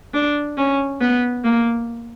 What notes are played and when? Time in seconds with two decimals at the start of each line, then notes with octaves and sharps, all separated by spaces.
0.14 D4
0.58 C#4
1.01 B3
1.44 A#3